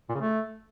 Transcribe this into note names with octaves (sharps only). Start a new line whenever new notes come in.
A#2
C#3
A3